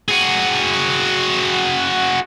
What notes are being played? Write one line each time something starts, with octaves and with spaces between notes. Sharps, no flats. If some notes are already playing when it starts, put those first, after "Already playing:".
F#4 G#4